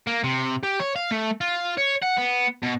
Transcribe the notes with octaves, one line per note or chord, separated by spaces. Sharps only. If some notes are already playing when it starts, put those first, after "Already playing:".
A#3
C3
G4
C#5
F5
A3
F4
C#5
F#5
B3
B2